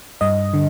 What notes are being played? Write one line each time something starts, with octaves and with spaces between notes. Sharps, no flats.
G2 D#5
D3